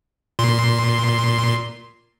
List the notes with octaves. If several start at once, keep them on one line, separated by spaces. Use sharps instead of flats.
A#2 C6